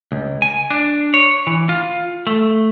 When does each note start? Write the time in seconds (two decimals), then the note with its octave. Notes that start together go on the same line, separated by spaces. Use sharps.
0.12 C#2
0.42 G#5
0.70 D4
1.14 C#5
1.47 E3
1.69 F4
2.27 A3